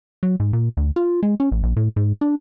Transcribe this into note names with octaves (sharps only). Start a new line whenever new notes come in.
F#3
G#2
A#2
D2
F4
G#3
C#4
A1
A#1
A2
G#2
D4